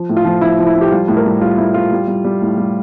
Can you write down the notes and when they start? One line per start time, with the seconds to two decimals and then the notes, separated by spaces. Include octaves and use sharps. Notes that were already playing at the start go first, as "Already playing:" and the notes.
Already playing: F3
0.09 A2
0.17 F4
0.25 F3
0.41 F3 E4
0.59 F3
0.66 E4
0.75 F3
0.81 G4
0.92 G3 F4
1.08 A2
1.17 A#4
1.25 G3
1.41 G3 F4
1.58 A2 E4
1.74 G3 F4
1.92 G3
2.07 G3
2.25 G3
2.42 A2
2.57 G3